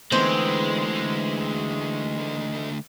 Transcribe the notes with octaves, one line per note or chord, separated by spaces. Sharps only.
D3 E3 G#3 A3 B3 C4 D#4